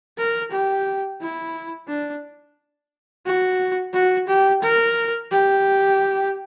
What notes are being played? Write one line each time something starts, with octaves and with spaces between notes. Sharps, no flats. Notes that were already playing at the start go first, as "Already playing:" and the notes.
A#4
G4
E4
D4
F#4
F#4
G4
A#4
G4